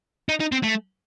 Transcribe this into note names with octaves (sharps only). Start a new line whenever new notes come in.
D#4
D#4
C4
A3